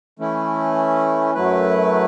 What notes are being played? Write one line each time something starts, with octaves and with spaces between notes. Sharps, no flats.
E3 A3 C#4 E4
F#2 F#3 A3 E4 B4